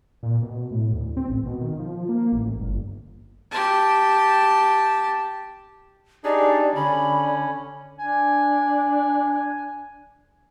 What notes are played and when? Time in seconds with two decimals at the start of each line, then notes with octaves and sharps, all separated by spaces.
0.23 A#2
0.42 B2
0.71 A2
0.93 D2
1.17 C4
1.28 A1
1.46 B2
1.61 D#3
1.79 F3
2.09 A#3
2.32 A1
2.60 G1
3.51 G4 A5
6.24 D4 D#4 G4 G#4 D5
6.75 D3 C#4 B5
7.99 D4 G#5